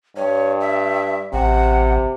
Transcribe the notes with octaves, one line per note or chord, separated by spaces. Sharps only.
G2 C#5
E5
A1 C3 F#5